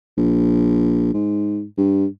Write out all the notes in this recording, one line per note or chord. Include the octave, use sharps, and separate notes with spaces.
A#1
G#2
G2